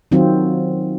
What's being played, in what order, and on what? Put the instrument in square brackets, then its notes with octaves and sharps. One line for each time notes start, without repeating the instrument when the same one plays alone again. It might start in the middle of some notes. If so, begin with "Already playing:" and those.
[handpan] D#3 F#3 C4 F4